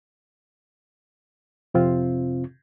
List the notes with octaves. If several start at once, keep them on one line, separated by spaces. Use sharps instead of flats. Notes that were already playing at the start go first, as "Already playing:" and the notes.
F2 C3 C4 F4